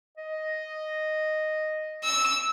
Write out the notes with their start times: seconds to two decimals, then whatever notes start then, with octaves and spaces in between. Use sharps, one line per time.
0.17 D#5
2.04 E6